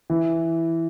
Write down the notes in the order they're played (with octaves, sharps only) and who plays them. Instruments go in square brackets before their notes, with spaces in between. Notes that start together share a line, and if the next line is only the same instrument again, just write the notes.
[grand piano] E3